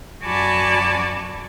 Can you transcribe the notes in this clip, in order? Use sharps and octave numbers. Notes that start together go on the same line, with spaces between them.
F#2 F#4 D5 G#5 A5 B5